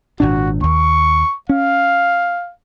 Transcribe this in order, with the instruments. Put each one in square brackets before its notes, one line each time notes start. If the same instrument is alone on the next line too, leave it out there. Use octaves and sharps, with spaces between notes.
[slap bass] G#1 A#2 D4 [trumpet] F#4
[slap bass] D#2 [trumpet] C#6
[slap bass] C#4 [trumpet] F5